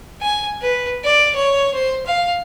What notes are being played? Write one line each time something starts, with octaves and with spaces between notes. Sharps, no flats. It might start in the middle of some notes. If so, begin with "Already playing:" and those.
G#5
B4
D5
C#5
C5
F5